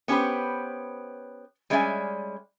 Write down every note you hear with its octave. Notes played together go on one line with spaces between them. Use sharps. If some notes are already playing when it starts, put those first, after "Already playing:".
B3 C#4 G4 B4 C5
G3 G#3 C#4 D5 E5 G#5